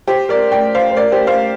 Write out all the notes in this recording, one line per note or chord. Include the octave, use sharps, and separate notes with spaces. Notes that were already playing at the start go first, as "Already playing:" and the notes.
G4 C5
A#4 D5
D5 G5
C5 F5
C5
A#4 D5
G4 C5
C5 F5